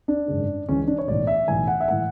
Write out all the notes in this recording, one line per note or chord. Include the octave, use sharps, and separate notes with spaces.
D4
G#1 F#2 C#3
C#2 C#3 E3 C#4
D4
C#5
B1 A2 E3 D5
E5
B1 A2 E3 G#5
F#5
E5
A2 E3 F#5